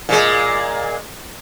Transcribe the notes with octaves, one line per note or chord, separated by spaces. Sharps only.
A#2 G#3